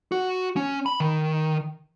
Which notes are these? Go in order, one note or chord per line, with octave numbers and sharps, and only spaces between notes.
F#4
C#4
B5
D#3